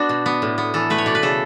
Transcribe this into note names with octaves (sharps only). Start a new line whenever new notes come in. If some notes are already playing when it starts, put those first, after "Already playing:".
Already playing: B3 D4 F#4
B2
B3
A2
B3
E3 A4
A3 B4
C#5
B2 D5
B4
C#3 A4